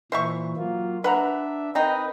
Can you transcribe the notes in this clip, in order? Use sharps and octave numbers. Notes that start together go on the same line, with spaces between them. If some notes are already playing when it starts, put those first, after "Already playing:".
A#2 E3 C5 E5 C#6
F#3 A#3 F4
D4 B4 E5 F#5 A#5
C4 D#4 A#4 B4 D#5 G5